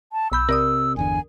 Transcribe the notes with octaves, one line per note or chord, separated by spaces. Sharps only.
A5
B1 B5 E6 G6
C3 A#4 D5 D#6
G1 E2 D3 G#5